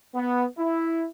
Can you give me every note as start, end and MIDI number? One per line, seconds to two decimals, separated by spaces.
0.15 0.45 59
0.58 1.06 64